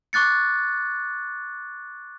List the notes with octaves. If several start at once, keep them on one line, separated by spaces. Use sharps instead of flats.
C#6 D6 F#6 A6 C#7